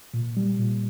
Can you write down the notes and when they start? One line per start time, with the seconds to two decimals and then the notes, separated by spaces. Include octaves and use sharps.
0.14 A#2
0.37 G3
0.59 A#2